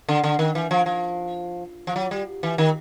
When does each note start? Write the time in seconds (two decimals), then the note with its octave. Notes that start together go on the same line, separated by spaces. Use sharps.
0.08 D3
0.24 D3
0.39 D#3
0.55 E3
0.71 F3
0.86 F3
1.87 F3
1.96 F#3
2.11 G3
2.43 E3
2.58 D#3